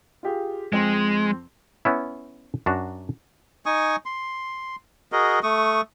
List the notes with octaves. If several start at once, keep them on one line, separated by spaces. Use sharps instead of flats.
F4 G4 G#4
F2 G#3 C4 C6
B3 C#4 E4
F#2 D4 F#4 A#5
D#4 G#5 C#6 D#6
C6
F#4 G#4 A#4 D#5
A3 C#6 D#6